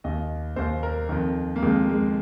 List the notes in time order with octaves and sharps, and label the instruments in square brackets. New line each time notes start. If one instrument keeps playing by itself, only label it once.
[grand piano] D#2 D#3 D#5
D#2 D#3 C5
A#4
F2 D#3
A#3
F2 D#3 G#3
G#3